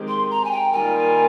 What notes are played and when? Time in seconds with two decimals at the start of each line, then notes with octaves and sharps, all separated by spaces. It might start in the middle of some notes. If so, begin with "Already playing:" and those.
Already playing: D#3 G#3 C4 G4
0.08 C6
0.31 A#5
0.45 G#5
0.51 G5
0.73 D#3 G3 A#3 F4 A#4 G#5